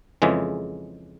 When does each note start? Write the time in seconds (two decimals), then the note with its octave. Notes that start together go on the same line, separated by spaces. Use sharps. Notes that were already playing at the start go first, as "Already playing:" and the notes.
0.22 F2 C#3 E3 G#3